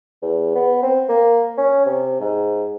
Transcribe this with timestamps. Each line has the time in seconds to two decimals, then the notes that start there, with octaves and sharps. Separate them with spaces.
0.22 E2
0.55 B3
0.83 C4
1.09 A#3
1.58 C#4
1.86 C3
2.20 G#2